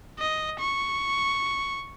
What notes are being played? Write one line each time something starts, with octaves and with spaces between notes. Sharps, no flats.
D#5
C#6